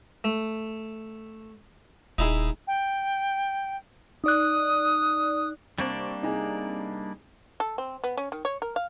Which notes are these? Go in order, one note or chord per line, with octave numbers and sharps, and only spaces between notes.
A3
D#1 D#4 E4 G#4
G5
D#4 D5 D#6 F#6
C3 G3 A#3 C4 D4 C#6
C3 D#4 G#4 A#5
A4
C4
B3
C#4
D#3
C#5
A#4
F5